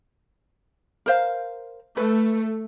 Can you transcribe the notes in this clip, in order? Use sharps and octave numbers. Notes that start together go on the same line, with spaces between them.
A#4 C5 F5
A3 B4